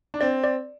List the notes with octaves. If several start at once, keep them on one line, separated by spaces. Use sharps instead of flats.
D4
C4 D5
D5